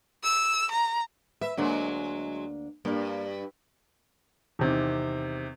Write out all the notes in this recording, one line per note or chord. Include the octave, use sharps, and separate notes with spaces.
E6
A#5
B4 E5
D2 F#3 G#3 A#3 D4
G2 A#3 D5
E2 C3 D#3